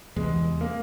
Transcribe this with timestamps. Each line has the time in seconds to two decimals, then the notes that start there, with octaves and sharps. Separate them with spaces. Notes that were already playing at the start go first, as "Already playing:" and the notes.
0.16 E2 C3 E3 G#3
0.61 A#3